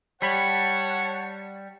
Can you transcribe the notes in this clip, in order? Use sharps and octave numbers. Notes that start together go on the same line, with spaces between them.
G3 C#5 F#5 A5 B5